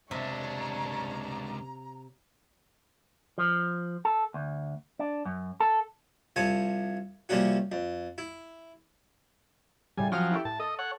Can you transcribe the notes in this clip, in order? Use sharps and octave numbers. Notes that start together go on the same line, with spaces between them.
C#2 C3 D4 C#5 A#5
F3
A4
D2
D4
F#2
A4
C2 F3 C#5 G#5 A5
C3 F3 G3 A#3 C#4 F#4
F2
E4
A2 C#3 G3 G#5
F3 F#3 C#4 G5 D#6 F6
E4 G4 A4
A2 A5
A4 D#5
C#5 F#5